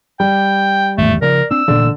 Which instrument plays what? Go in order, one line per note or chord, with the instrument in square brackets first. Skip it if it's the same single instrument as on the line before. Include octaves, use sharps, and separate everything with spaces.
[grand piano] G3 [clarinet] G5
[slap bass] G#1 E2 A2 [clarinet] A3
[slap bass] C#3 F3 [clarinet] A#4 [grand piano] D5
[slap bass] C4 D4 [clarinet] E6
[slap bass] A1 A#2 E3 [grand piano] D3 D5